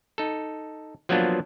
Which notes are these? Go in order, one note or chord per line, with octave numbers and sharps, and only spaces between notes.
D#4 A4
F3 F#3 A#3 B3 D4 F4